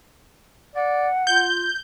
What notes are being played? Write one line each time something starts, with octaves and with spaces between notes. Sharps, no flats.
D5 F#5
F4 G6